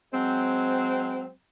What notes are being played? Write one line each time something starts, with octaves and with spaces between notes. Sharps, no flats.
F#3 G#3 C4